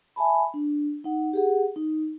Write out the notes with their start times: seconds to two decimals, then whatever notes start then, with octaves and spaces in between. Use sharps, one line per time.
0.16 E5 G#5 A5 B5
0.54 D4
1.04 D#4 F#5
1.33 G4 G#4 F#5
1.76 D#4